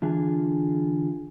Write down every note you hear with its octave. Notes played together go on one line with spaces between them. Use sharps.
D3 E3 D4 F4 G#4